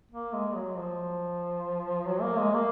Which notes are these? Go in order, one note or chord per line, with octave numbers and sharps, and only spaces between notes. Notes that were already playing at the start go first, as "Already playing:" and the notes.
A#3
G#3
F#3
F3
F#3
A#3
G#3
A#3